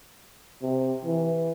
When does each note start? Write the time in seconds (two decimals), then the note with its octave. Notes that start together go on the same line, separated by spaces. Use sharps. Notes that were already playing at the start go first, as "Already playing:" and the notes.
0.62 C3
1.05 E3